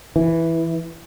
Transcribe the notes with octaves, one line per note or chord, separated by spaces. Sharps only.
E3